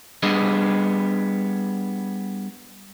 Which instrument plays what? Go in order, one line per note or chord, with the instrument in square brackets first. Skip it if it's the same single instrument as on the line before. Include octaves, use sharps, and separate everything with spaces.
[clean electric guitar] G3 B3 D4 G#4 D#5